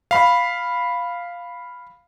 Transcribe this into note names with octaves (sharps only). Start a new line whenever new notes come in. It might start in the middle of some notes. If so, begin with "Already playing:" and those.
F5 B5